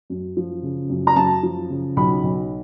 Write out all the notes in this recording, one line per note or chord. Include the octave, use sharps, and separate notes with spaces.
F#2
F3
C#3
F#2
A#5
F#2 A5
F3
C#3
B1 B5
B1